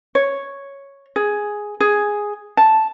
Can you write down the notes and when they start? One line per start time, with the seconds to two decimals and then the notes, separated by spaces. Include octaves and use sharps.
0.15 C#5
1.16 G#4
1.80 G#4
2.57 A5